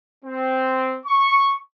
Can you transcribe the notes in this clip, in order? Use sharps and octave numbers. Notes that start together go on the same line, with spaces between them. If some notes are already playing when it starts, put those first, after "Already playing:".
C4
C#6